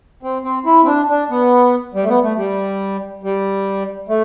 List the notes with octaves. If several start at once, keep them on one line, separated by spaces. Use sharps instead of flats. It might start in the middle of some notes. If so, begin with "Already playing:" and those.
C4
C4
E4
C4
D4
D4
B3
G3
A3
B3
A3
G3
G3
A3